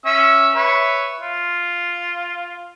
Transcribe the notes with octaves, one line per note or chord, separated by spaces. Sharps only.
C#4 E5 E6
B4 C#5 E5
F4